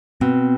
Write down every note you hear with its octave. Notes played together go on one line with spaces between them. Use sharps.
B2 C4